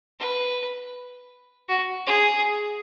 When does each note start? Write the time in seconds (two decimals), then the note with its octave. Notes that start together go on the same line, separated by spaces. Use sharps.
0.19 B4
1.68 F#4
2.07 G#4